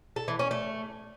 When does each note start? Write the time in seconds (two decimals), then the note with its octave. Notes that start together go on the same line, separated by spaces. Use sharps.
0.16 A4
0.28 E3
0.39 C#4
0.51 A3